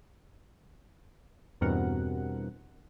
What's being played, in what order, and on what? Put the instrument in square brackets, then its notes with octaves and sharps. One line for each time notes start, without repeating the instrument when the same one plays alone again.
[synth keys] E2 G2 B2 C4 A#4 F#5